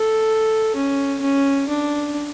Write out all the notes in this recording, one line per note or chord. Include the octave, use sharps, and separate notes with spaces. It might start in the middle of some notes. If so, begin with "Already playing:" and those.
Already playing: A4
C#4
C#4
D4